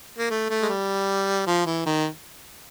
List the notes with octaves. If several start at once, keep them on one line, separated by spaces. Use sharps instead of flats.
A#3
A3
A3
G#3
G3
F3
E3
D#3